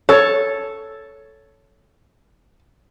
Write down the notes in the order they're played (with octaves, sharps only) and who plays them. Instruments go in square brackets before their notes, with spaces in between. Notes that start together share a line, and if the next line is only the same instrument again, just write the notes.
[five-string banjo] A4 [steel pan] C#5